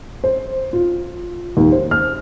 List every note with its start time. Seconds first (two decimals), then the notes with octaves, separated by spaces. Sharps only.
0.24 C5
0.73 F4
1.57 D#2
1.72 C5
1.91 F6